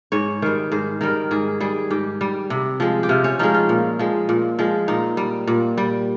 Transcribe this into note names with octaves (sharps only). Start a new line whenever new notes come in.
G#2 C#5
D#3 G3 C5
G#2 C5
D#3 G3 A#4
G#2 G#4
G3 G#4
G#2 G4
G3
C3
F3 G#3
G4
C3 F4
C#4
F3 G#3 D#4
F4
A#2
F3 G#3
A#2
F3 G#3
A#2 D#4
G3
A#2
G3